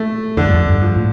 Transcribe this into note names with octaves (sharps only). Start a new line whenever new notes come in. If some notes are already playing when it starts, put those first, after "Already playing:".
Already playing: A3
F2 D3
G2
F2
G2
F3
A2